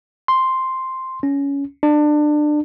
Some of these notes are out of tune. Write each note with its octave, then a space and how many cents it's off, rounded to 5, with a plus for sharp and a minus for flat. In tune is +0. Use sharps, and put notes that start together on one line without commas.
C6 +0
C#4 +15
D4 +25